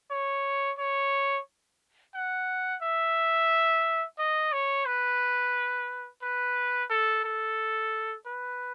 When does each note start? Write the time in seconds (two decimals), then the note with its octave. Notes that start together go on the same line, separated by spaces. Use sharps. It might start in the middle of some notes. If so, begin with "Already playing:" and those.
0.11 C#5
0.78 C#5
2.15 F#5
2.82 E5
4.19 D#5
4.53 C#5
4.86 B4
6.23 B4
6.90 A4
7.24 A4
8.26 B4